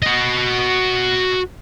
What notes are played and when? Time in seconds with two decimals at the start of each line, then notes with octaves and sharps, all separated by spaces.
0.02 F#4 D#5